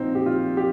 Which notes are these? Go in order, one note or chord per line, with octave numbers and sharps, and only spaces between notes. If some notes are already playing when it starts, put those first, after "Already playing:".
Already playing: A#1 A#2 F3 C4 D#4
G4
F4
G4